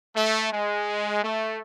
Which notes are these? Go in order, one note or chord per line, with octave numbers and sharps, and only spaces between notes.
A3
G#3
A3